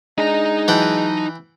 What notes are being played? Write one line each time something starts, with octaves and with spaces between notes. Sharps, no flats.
G#3 D4 D#4 A#5
E3 F#3 F#5 G5 A5